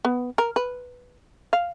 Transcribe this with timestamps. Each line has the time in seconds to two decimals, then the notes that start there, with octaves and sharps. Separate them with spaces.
0.05 B3
0.38 A#4
0.56 B4
1.53 F5